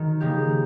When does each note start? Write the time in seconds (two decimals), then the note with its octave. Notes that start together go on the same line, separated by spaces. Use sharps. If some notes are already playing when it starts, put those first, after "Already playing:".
Already playing: D#3 F#3
0.20 C#3 F3 A#3 D#4 G4